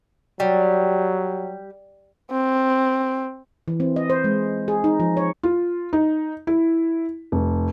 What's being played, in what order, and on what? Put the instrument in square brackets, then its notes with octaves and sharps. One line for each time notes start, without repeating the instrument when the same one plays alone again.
[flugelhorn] F#3 [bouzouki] G3
[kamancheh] C4
[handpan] E3
C4
D#5
C5
G#3
G#4
D#4
F3
C#5
[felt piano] F4
D#4
E4
F1